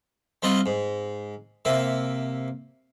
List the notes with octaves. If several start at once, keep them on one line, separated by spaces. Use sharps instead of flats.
G3 C4 F4 D#5 F#5
G#2
C3 A#3 E5